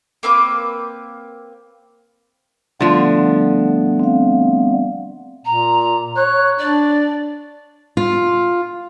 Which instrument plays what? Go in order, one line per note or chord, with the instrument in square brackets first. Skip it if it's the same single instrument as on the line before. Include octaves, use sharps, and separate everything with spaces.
[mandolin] A#3 C4 B4 D6
[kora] D3 F3 [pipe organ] G3 A3 B3
[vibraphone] C4 F5
[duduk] A#2 [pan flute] A#5
[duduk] C#5 [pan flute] F#6
[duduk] D4 [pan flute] D5
[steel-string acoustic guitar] F4